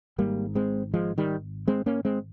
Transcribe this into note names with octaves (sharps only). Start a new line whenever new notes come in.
G#1 G#2 G3 A#3
G#3 C4
F3 G#3
D#3 G3
G#3 C4
A#3 C#4
G#3 C4